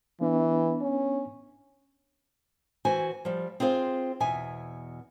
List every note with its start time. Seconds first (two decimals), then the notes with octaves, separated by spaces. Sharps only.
0.21 E3 B3 D4
0.81 C#4
2.85 E3 F#4 C5 G#5
3.25 F3 G3
3.60 C4 F4 G#4 C5 F5
4.20 E2 B2 E5 G#5